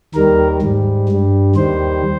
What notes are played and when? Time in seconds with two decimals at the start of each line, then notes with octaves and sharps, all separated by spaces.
0.15 D#2 D#3 G3 A#4
0.62 G#2 G3
1.09 G2 G3
1.56 D#2 D#3 G3 C5